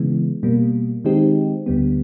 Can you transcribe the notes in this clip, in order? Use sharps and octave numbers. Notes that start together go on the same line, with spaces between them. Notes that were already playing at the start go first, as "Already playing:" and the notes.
Already playing: C#3 E3 G#3 B3
B2 G3 A#3
D#3 G#3 C4 D#4 G4
D2 D3 G3 B3